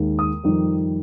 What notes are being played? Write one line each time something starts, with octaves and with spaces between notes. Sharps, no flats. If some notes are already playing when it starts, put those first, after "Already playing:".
Already playing: D#2 D#3 G#3
D#6
F2 D#3 G3